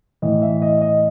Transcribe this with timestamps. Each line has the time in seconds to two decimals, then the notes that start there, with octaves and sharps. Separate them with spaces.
0.22 A2 E3 D#5
0.42 E5
0.62 D#5
0.82 D#5